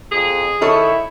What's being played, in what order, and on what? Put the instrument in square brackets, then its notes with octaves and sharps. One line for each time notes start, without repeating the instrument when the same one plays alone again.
[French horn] F2 [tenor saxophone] G#4
[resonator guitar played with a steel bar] D#3 A4 C#5 [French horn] E4